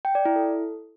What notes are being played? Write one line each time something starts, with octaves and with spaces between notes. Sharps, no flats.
G5
D5
E4
A4